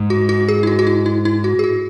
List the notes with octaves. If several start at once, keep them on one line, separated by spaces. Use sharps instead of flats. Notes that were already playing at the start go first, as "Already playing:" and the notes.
Already playing: G#2
F#4
F#4
G#4
E4
F#4
F#4
E4
E4
E4
F#4
G#4
F#4